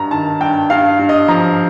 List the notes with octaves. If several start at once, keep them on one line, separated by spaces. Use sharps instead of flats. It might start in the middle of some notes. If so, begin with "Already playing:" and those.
Already playing: G2 G3 A#5
D#3 A5
G2 G5
G2 F5
G2
D#5
F3 A#5